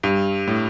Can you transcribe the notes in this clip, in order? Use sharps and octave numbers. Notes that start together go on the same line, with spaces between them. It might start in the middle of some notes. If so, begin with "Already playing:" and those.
G2
A2